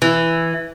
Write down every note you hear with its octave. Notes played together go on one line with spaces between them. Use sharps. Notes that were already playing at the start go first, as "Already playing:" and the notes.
E3